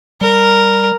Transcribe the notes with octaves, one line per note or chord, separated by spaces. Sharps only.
G3 A#4